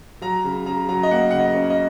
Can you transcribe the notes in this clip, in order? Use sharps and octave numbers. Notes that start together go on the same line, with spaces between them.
F#3 A#5
C#3
C#3 A#5
F#3 A#5
D#5
A#3 F#5
C#3 F#5
D#5
C#4
D#5